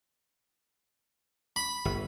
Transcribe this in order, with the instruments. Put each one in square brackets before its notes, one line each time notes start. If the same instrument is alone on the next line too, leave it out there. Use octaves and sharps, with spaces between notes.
[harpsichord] B5
[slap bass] G1